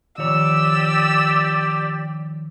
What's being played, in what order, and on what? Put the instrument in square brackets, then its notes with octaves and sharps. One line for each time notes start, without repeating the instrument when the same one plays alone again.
[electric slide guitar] D#3 F3 C#5 [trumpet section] G4 D5 [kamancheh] E6